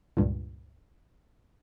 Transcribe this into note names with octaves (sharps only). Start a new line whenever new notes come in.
C#2 G2 A#2